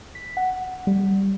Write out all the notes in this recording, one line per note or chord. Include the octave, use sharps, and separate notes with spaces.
B6
F#5
G3
G3